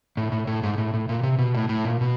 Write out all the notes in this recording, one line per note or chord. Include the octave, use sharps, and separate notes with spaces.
A2
A2
A2
G#2
A2
A2
A#2
C3
B2
A2
A2
A#2
B2